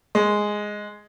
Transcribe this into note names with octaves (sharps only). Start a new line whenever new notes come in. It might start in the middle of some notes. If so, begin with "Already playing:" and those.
G#3